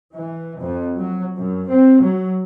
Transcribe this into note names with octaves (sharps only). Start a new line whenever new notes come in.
E3
F2
F#3
F#2
C4
F#3